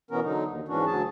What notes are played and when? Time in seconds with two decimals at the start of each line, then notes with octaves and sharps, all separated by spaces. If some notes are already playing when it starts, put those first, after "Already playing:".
0.11 B2 E3 B3 C#4 A#4
0.23 D3 F#3 D#4
0.47 D#2
0.68 G#2 E3 C#4 D4 F#4
0.86 D2 F#3 G#4 A5